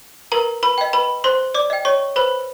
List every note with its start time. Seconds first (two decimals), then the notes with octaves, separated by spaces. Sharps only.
0.32 A#4 B4 A#5
0.63 B4 B5
0.78 D#5 G5
0.93 B4 B5
1.24 C5 C6
1.54 D5 D6
1.70 D#5 G5
1.85 C#5 C#6
2.16 B4 C5 B5